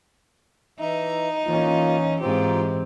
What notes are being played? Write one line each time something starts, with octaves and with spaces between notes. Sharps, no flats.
E3 D#4 E5 A#5
E3 A#3 C#4 F4
G#2 E3 C4 D#4 F4 G4